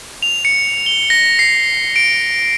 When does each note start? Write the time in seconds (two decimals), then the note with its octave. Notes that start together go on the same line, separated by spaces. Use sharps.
0.23 F7
0.45 C#7
0.86 G7
1.10 A#6
1.39 C7
1.96 D7